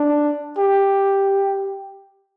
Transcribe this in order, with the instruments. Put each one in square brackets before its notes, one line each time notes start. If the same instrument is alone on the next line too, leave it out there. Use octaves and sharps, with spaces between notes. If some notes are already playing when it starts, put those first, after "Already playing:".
Already playing: [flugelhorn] D4
G4